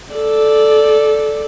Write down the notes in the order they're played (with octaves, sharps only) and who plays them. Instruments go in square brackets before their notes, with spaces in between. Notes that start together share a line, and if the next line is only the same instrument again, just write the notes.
[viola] A4 D5